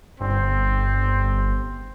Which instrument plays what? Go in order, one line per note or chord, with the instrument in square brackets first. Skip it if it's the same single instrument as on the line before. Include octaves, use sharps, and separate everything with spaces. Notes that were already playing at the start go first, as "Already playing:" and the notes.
[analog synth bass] G1 [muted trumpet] C4